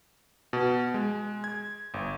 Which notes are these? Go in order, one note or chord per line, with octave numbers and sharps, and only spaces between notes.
B2
G#3
G#6
G1